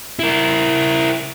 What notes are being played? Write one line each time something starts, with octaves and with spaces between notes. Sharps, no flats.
E4 A#4